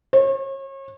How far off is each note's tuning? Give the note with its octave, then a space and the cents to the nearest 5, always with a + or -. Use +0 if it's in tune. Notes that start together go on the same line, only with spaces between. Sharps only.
C#5 -35